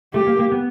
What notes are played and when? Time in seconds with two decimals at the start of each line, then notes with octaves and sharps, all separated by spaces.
0.14 A3 G4
0.27 A#3
0.39 A#3
0.52 B3